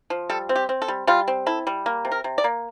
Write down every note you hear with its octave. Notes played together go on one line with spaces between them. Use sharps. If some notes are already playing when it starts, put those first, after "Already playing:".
F3
G3 A4
C4
G4
C4
A4
G3
G3 F4
C4
E4 A4
G3
A#3
C3
A#4
C3
D5
A#3